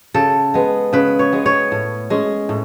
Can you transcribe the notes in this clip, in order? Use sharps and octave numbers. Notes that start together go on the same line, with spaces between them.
C#3 A4
G#3 B3
C#3 B4
C#5
G#3 B3
C#5
A2
G#3 C#4
A2